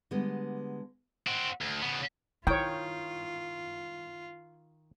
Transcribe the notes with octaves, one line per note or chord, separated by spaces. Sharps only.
D3 G3 G#3 B3
C4 F#4
D2
C#3 B3
D#3 E4 F4 C#5 G5